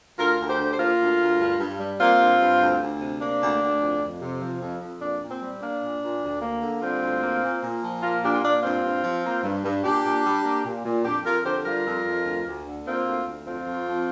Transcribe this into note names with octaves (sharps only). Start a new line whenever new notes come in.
D2 F4 A#4
D2
G4 C5
D3
C5
A#3 F4 A#4
D2
D2
G2
G2
G3
A#3 C4 F4
G2
G2
D2
D2
C3
A#3 D4
D2
D2
F2
F2
C3
F3
F2
F2
A#2 D4
A#2
C4
G3
A#3 D4
A#2
A#2
D2
A#3
D3
G3 C4 F4
D2
A#3
A#2
A#2
F3
A#3 F4 A#4
A#2 D4 G4
F4
A#2 D4
G2 C4 F4
G2
F3
A#3
G2
G2
A#2 D4 G4
A#2
G3
A#3
A#2
A#2
F2 D4 G4
F2 F4 A#4
D3 G4 C5
G3 F4 A#4
F2
F2
D2
D2
D3
A#3 C4 F4
D2
D2
F2 C4 F4
F2
F3